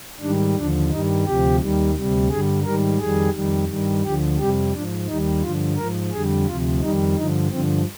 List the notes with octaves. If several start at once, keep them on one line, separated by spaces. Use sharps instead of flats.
G#2 D#3 G3 D4
D#2 D3 F3 D4
G2 D#3 G3 D#4
D2 C3 F3 G4
D#2 D#3 G3
D2 C3 G3
G2 D3 G3 G#4
G#2 D#3 G3 A#4
F2 D#3 G3 G#4
F2 D#3 G3
G2 D#3 G3
D2 D3 F3 G4
F2 C3 G3 G4
G#2 F3 D4
D#2 D#3 G3 D#4
G2 D3 F3 F4
G#2 F3 A#4
F2 D3 G3 G#4
D2 C3 F3 F4
F2 D#3 G3 D#4
G2 D3 F3 D#4
G2 D3 F3 C4